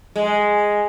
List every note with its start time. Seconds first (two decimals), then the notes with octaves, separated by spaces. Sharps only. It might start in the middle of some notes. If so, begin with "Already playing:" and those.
0.16 G#3